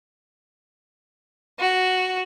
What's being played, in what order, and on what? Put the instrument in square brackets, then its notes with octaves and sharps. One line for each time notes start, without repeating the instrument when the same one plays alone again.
[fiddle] F#4